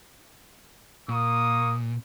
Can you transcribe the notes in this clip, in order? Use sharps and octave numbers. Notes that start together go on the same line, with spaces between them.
A#2 A#3 C#6 D#6